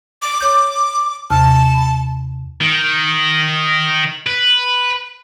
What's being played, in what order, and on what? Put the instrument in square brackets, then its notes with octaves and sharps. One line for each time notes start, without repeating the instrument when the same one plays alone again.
[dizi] D6
[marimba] C#5 G6 [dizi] D6
[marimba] D#2 C3 F6 [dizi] A5
[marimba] B5
[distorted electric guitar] D#3
B4